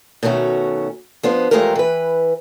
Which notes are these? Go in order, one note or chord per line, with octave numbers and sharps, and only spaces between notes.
B2 D#3 A3 C#4 F#4
F3 B3 D4 C5
E2 F3 G#3 A3 G4 A#4
E3 B4